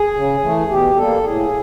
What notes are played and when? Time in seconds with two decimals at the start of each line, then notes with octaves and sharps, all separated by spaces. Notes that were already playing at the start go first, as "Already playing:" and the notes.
Already playing: G#4
0.14 C#3
0.41 E3 A3
0.69 B2 G4
0.96 G3 A#3 A4
1.24 A2 G#4